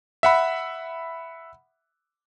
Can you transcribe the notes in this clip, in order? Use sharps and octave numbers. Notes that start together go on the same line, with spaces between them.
E5 F#5 B5